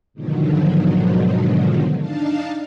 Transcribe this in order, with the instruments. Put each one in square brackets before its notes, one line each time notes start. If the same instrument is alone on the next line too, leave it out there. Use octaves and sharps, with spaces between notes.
[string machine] G#2 B2 D3 D#3 F3 F#3
D4 D#4 F5 A5